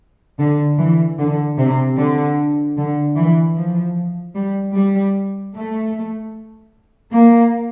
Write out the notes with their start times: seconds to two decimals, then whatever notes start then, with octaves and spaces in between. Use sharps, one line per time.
0.39 D3
0.78 E3
1.18 D3
1.58 C3
1.97 D3
2.77 D3
3.16 E3
3.56 F3
4.34 G3
4.75 G3
5.53 A3
7.11 A#3